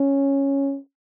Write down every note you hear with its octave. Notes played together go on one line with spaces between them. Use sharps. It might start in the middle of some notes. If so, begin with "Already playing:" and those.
Already playing: C#4